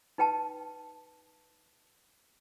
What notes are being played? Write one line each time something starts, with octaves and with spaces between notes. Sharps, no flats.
D#4 B4 G5 A5